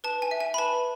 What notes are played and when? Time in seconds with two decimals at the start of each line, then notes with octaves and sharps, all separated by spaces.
0.04 B4 A5
0.22 G#5
0.31 E5
0.40 G#5
0.54 B5
0.58 B4 A5